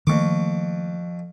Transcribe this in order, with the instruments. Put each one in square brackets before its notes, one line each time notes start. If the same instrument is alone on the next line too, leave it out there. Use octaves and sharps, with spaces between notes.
[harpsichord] F2 C#6 D6 [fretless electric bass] D#3 A3 A#3